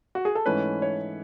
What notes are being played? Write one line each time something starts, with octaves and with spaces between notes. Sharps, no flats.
F#4
G#4
A4
G#2 E3 A3 C#4 B4
C#5